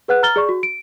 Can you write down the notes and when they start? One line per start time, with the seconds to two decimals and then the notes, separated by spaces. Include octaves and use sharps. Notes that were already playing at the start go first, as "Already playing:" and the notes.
0.08 G#4 B4 F#5 F#6
0.23 A#5 F6 A6 G7
0.36 G#4 D5 C#6
0.49 F#4
0.63 D7